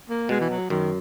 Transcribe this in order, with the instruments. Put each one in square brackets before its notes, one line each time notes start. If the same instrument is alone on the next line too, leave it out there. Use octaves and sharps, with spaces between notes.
[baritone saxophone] A#3
[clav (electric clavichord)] B2 [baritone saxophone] G#3
[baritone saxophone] E3
F#3
[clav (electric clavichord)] F#2 [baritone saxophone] D#3